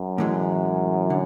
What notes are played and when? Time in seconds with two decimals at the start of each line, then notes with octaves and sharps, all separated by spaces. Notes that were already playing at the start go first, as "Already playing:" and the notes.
Already playing: F#2
0.18 A2 E3 G#3
1.10 D3